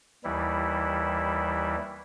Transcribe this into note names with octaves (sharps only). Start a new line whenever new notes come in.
D#2 E3 G3 E4